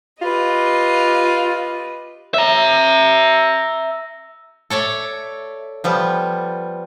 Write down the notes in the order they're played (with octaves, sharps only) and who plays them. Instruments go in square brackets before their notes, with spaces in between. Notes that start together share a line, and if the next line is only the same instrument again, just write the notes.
[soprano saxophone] F4 [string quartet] G4 B4 D#5
[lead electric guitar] E5 A#5
[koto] A4 C#5 D5 E5
F3 G3 B3